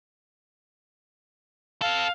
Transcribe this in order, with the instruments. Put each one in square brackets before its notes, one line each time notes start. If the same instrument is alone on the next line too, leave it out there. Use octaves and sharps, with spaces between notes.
[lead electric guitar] C4 A4 [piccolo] F5